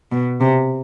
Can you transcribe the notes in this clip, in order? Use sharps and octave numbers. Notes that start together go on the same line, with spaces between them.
B2
C3